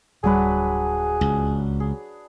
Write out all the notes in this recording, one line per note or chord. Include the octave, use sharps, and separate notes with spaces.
D1 F#3 G3 D4 G#4 B4
C#2
G#4